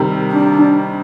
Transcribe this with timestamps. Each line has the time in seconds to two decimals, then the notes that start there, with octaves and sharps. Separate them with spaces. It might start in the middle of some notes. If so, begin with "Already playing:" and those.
Already playing: C3 D#3 G3
0.32 D4